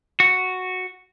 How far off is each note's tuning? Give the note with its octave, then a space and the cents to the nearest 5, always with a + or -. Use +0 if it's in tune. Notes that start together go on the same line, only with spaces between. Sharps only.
F#4 -5